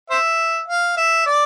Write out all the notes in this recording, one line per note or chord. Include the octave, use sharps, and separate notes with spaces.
C5 E5
F5
E5
D5